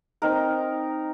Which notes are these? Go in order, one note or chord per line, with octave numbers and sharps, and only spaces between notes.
C4 D#4 A#4